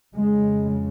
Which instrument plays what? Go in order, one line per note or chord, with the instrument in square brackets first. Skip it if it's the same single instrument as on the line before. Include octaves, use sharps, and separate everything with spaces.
[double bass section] F2 C#3 G#3